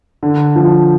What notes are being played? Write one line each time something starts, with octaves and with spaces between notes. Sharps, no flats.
D3
F3